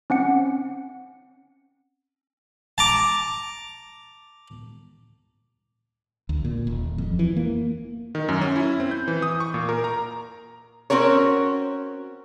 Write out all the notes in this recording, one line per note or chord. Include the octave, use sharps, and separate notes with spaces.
C4 C#4 F#5 C#7
A5 A#5 D6
D2
A#2
D#1
F2
E3
A#3
D#3
F#2
C#4
E4
C4
G6
E3
D#6
C#6
A#2
A#4
A#5
C4 C#4 F#4 A#4 C#5